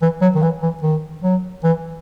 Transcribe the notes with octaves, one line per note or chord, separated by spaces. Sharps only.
E3
F#3
D#3
E3
E3
D#3
F#3
E3